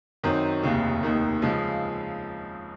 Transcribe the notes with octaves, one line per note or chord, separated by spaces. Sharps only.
F#2 D#3 F#3 C4
F1 D#2 C#3
F1 D#2 D#3
C#2 C#3 F3 G#3